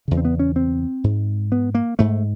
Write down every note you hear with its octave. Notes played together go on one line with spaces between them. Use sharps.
E2 C#3
C4
B3
C#4
C4
G#2
B3
A#3
G#2 A3